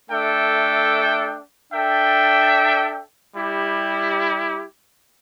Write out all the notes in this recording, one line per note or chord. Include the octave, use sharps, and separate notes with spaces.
A3 D4 A4 E5 G5
D4 A4 E5 G5
G3 E4 G4